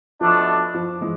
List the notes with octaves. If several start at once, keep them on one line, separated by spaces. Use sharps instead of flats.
B2 F3 A3 D4
F3
E3 G#3